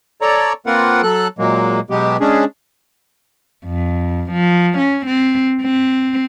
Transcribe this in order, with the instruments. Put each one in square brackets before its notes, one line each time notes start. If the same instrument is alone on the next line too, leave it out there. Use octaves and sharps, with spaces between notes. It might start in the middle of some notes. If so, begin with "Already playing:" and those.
[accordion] A4 C#5 D5 A#5
A#3 C4 F4 A#4 B4 F#5
F#3 A4 F#6
A#2 F#3 G#3 A#3
B2 F#3 G#3 B3 G4
G#3 C#4 D4 G#4
[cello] F2
F3
C#4
C4
C4